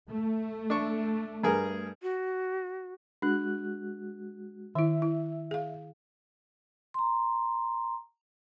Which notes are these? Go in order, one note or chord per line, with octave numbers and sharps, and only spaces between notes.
A3
D4 C#6
G2 G#4 A#4
F#4
G#3 D4 F#4 F#6
D#3 E4 E5
E4
G#4 F5
A#5 C6